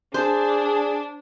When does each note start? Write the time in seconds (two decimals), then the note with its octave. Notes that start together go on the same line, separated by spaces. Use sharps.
0.14 D4 G#4 C5